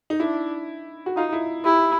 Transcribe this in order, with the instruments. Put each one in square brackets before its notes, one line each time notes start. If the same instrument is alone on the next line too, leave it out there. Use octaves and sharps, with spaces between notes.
[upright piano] D#4
[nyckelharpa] D4 [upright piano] E4
[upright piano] F#4
[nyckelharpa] D#4 [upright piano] F4
[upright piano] E4
[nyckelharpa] E4 [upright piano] G4